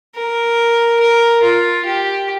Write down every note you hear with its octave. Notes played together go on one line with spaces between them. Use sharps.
A#4
A#4
F4
G4